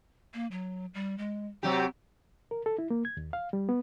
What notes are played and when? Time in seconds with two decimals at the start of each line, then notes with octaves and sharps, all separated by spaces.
0.34 A#3
0.51 F#3
0.94 G3
1.18 G#3
1.63 C3 F#3 C4 G4
2.51 A#4
2.66 A4
2.78 E4
2.90 A#3
3.05 G#6
3.17 D#2
3.33 F5
3.53 G3
3.69 B3